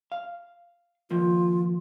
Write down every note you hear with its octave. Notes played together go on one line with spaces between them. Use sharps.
F5
D#3 F3 A#3 F4